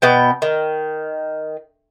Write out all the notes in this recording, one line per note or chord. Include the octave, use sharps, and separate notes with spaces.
B2 B3 G5
D#3